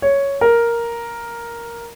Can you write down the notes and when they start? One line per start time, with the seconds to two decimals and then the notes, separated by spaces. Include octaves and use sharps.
0.02 C#5
0.41 A#4